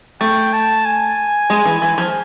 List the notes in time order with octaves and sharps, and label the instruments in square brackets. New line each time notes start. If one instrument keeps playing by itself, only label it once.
[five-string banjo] A3 [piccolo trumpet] G5
[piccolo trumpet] A5
G#5
[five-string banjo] G#3
E3
E3
F3